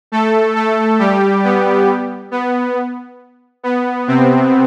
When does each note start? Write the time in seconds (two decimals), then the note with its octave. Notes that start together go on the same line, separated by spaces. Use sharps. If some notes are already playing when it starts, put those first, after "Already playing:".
0.12 A3 A4
0.56 A3 A4
0.99 G3 G4
1.44 B3
2.31 B3
3.63 B3
4.08 C3 C4